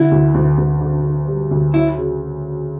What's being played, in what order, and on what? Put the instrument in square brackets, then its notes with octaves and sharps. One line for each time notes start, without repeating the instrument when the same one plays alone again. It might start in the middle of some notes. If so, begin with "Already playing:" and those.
Already playing: [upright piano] D3 [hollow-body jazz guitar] E4
[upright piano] D2
D2
D2
D3
D3
G3
D2
[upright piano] F#3 [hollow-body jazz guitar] E4
[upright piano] C#3